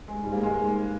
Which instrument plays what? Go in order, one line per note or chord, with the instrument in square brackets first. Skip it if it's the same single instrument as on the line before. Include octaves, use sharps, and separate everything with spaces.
[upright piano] G#3
[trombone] G#2 [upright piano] G3
[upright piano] A#3
G#3